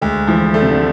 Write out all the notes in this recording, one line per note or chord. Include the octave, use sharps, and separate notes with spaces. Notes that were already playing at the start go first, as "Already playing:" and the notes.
D2 G#3
E3 F3
D3 A3
C3
D3